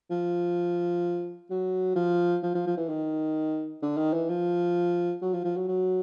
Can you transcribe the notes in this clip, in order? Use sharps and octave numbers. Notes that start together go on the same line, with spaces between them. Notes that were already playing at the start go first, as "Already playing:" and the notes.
F3
F#3
F3
F3
F3
F3
E3
D#3
D3
D#3
E3
F3
F#3
F3
F3
F#3
F#3